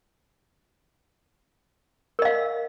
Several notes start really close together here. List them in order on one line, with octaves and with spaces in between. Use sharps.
A#4 D#5 F5